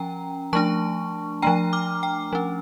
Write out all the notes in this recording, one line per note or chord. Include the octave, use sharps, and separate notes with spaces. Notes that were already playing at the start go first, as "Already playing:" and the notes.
Already playing: F3 C#4 G5 A#5
F3 A3 D4 A5 C#6
F3 A3 D4 G5 A#5
D6 F6
G5
F3 C#4